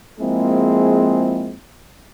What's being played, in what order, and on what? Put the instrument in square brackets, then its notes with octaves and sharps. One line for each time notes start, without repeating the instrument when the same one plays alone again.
[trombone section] F3 G#3 A#3 C4 E4 G#4